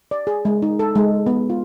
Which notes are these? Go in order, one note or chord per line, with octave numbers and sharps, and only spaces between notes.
D5
G#4
G#3
D#4
A4
G#3
B3
F4